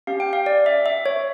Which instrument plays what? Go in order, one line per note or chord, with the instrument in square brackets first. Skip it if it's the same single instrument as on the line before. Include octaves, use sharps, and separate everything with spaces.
[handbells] C#4 G4 F5
G5
F5
D5
E5
E5
C#5